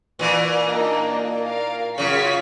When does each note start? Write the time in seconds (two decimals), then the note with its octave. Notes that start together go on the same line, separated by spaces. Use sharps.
0.19 A#2 E3
0.64 A#3 D4 D#4
1.41 A#4 F5
1.98 F#2 C#3 F4 C#6 B6